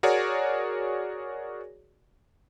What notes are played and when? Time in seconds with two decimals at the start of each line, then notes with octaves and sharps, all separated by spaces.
0.03 F#4 G#4 A#4 C#5 D5